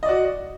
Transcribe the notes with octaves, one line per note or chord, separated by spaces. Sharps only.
F#4 D5 D#5